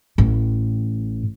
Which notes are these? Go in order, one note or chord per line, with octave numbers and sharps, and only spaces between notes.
A1 A2